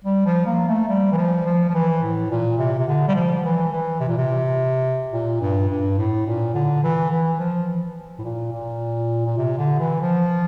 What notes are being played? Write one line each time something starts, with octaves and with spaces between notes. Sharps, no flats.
G3
F3
A#3
A3
G3
E3
F3
F3
F3
E3
A2
A#2
C3
C3
D3
G3
F3
E3
E3
C3
A#2
C3
A#2
G2
G2
A2
A#2
D3
E3
E3
F3
A2
A#2
A#2
A#2
C3
D3
E3
F3